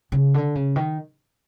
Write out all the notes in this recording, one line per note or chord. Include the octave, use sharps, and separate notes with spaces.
C#3
D3
C#3
D#3